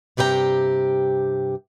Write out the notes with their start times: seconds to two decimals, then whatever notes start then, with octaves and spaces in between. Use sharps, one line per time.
0.17 G2 C3 G4 B4 G5 A#5